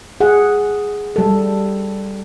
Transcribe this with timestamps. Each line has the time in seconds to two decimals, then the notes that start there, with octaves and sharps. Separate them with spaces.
0.20 G#4 F#5
1.16 G3 A4